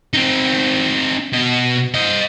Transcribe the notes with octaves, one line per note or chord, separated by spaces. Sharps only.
C4 D#4
B2 D#5
C5 D#5